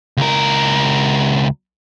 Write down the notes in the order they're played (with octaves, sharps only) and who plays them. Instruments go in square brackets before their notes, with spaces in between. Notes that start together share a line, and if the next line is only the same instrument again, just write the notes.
[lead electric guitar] C#2 A#4